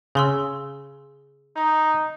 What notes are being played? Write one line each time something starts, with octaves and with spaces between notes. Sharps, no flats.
C#3 G#4 C6 E6
D#4